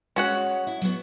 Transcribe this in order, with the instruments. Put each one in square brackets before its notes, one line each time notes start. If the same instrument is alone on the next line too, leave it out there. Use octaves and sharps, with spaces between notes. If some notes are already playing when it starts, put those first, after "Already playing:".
[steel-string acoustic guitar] G#3 C#5 [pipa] C#4 F#4 F#5
[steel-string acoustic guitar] E4
F#3 B3